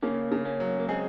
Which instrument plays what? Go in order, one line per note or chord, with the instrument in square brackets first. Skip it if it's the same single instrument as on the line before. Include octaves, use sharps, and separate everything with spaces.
[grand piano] C#3 [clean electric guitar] A#3 C#4
[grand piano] C#3
[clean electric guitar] A#3 C#4
[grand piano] F#3
[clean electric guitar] A#3
[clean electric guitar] G#3 C4 [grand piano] G#4